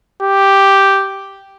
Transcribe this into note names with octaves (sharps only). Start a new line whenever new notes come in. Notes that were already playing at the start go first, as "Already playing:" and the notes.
G4